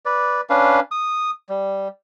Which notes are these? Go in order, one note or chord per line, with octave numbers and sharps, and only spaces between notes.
B4 D5
C#4 D4 B4 F5
D#6
G3